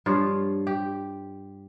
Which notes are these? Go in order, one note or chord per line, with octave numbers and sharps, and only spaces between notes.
G2 F3 F4 C#5
G4